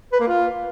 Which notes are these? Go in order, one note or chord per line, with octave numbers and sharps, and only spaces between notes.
B4
A#3
F4